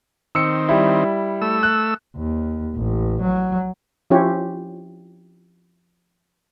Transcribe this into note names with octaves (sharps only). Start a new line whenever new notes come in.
D#3 C4 E6 C#7
G3 E4
A3 E6
F#6
D#2
A1
F#3
F3 C#4 E4 F4 G4 C#5